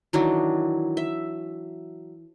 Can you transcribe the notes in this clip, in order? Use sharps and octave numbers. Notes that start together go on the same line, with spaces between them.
D#3 E3 F#3 D4
E5